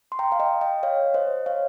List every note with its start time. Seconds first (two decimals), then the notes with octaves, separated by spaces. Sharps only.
0.12 C6
0.19 G5 A#5
0.32 F5
0.40 D#5 G5
0.61 D#5 G5
0.83 C#5 F5
1.14 C5 D#5
1.46 C#5 F5